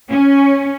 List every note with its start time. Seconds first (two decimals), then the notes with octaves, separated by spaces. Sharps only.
0.11 C#4